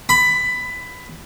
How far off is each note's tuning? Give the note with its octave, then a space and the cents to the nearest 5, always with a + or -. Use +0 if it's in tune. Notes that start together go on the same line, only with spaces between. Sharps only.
B5 +15